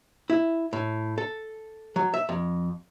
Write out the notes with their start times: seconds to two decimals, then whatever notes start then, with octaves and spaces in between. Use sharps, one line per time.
0.30 E4
0.73 A2
1.18 A4
1.96 F#3
2.14 E5
2.29 F2